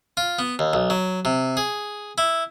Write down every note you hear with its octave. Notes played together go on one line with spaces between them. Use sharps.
F4
B3
D#2
B1
F#3
C3
G#4
E4